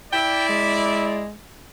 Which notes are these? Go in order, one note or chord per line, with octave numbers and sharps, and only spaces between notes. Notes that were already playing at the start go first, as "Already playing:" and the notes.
E4 D5 G5
G#3